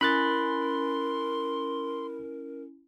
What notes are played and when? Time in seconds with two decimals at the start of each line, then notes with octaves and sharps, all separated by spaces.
0.01 C#4 E4 A#4 B5 C6 F#6 A6